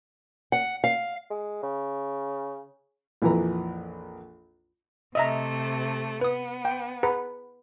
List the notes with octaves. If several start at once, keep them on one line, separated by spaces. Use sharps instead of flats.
F#5
F5
G#3
C#3
A#1 F2 E3 F3 B4 A#5
C3 A3 D#5 E5 A#5
B3 B4 D#6
G5
G#4 B4 F#5 A#5